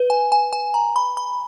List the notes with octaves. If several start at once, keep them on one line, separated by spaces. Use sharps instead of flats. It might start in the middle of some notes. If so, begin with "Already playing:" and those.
Already playing: B4
G#5
G#5
G#5
A#5
B5
B5